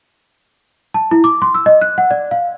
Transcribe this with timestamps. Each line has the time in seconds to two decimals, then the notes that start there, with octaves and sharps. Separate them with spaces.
0.94 A5
1.11 E4
1.24 D6
1.42 C6
1.54 E6
1.66 D#5
1.81 F#6
1.98 F#5
2.11 D5
2.31 F5